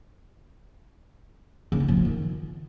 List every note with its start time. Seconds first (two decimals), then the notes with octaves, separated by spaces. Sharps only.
1.72 C#3
1.80 C4
1.88 F3
1.97 F4
2.05 D#3